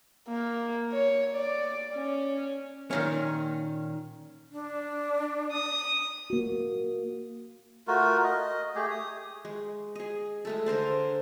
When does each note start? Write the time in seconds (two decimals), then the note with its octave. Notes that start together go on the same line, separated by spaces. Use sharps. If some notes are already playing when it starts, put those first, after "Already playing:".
0.28 A#3
0.92 C#5
1.35 D5
1.95 C#4
2.91 A#2 D#3 C#4
4.52 D4
5.51 D#6
6.30 A#3 F#4
7.88 A3 F4 F#4 A#4
8.23 D#5
8.75 A3 G4 G#4
8.90 D#6
9.45 G#3
9.95 G#4 D#5
10.45 G#3 A3 A4
10.66 D3 A#4 C5 D5